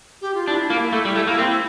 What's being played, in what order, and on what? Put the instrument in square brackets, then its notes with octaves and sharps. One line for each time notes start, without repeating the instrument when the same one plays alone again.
[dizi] G4
F4
[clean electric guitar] D4 [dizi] E4
[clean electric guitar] A#3
A3
G3
A3
A#3
C4